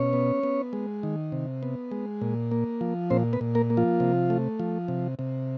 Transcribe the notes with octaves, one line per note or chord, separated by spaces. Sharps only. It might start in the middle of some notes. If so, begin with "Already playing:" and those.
Already playing: B2 C#4 C#5
B3
B3
G#3
D#3
C3
B3
G#3
A#2
A#3
F3
A#2 C4 C5
B3 B4
A#2
A#3 A#4
A#3
F3 F4
C3
A3
F3
C3
C3